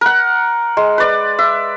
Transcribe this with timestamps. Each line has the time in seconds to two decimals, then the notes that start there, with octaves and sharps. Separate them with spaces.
0.01 A#4 F#5
0.77 G#3
0.98 B4 D5
1.39 E5